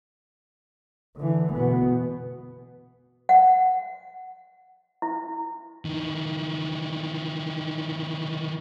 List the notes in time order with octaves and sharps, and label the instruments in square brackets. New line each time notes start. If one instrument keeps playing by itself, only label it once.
[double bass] D3 E3
B2 B3
[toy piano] F#5
E4
[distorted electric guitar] D#3 E3